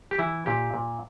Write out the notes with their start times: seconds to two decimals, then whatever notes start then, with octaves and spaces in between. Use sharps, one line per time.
0.11 G4
0.18 E3 E4
0.46 A#2 G4
0.74 A#2